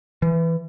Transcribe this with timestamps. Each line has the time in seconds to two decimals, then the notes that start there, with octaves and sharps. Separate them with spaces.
0.22 E3